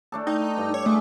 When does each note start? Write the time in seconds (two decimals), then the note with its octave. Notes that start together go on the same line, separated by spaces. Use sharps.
0.12 A3 D4 A4
0.27 D#4 G5
0.57 G2
0.74 C#5 D5
0.86 G#3 A3